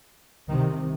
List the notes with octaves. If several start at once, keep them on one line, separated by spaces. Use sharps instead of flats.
C2 C3 D#3